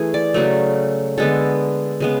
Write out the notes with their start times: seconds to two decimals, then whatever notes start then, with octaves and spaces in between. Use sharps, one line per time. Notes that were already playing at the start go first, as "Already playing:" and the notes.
Already playing: E3 A3 G#4
0.14 D5
0.34 C#3 F#3 A3
1.18 D3 G#3 B3 A4
2.00 C#3 G#3 B3